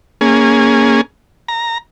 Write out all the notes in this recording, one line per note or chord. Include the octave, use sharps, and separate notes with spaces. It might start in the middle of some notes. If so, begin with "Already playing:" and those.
A#3 C#4 G#4
A#5